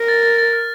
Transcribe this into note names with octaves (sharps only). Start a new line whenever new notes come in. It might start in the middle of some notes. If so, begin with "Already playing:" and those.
Already playing: A#4
A6
A6
A6
F6